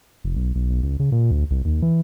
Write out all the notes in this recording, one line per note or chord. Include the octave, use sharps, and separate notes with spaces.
F1
B1
B1
B1
C#2
C#3
A#2
D2
C2
D#2
E3